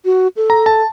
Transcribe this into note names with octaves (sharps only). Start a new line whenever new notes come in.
F#4
A4
A#5
A5